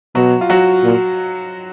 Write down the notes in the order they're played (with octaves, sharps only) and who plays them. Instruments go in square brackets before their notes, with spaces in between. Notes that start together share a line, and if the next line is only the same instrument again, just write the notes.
[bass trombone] B2 [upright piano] F#3 F#4
[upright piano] F4
F#3 F#4
[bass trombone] A#2